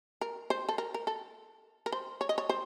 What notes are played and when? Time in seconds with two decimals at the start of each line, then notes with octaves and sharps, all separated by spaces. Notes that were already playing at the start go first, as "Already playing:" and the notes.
0.21 A#4
0.50 C5
0.69 A4
0.78 A#4
0.94 A#4
1.07 A4
1.86 A#4
1.92 C5
2.21 C#5
2.29 D#5
2.38 C#5
2.49 C5